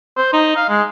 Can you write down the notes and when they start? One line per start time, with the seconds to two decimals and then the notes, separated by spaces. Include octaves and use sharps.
0.17 C5
0.33 D#4
0.56 F5
0.69 G#3